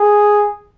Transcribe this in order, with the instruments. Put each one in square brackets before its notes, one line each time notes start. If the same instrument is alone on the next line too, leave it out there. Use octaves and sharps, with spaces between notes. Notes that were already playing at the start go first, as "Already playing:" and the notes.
Already playing: [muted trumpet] G#4